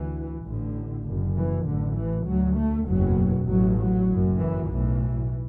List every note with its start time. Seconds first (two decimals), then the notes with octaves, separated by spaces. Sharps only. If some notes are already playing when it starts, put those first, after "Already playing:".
Already playing: D2 E3
0.44 A1 A2 D3
1.05 F#1 F#2
1.35 E3
1.65 A1 A2 D3
1.96 E3
2.25 D2 F#3
2.56 A3
2.87 F#1 E2 B2 F#3
3.47 A1 A2 F#3
3.77 F#3
4.08 F#1 F#2
4.38 E3
4.68 B1 A2 E3